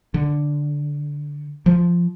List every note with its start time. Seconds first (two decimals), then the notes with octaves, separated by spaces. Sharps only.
0.14 D3
1.66 F3